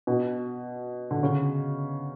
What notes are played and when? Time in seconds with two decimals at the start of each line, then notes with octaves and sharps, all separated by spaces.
0.07 B2
1.11 D3
1.23 C#3